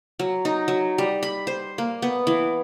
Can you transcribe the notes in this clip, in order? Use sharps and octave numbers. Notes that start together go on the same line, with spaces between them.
F#3
D#4
F#3
G3
B5
C5
A#3
B3
E3